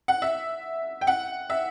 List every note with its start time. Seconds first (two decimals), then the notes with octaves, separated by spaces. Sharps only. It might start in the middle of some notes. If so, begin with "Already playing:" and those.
0.08 F#5
0.22 E5
1.01 G5
1.07 F#5
1.50 E5